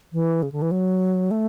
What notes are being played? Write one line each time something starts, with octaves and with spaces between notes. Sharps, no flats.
E3
C#3
D3
E3
F#3
A3